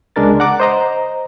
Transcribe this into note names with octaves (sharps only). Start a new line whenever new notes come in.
C#2 G#3 D4 A#4 A6
F#5 A#5 D6
C5 D#5 A#5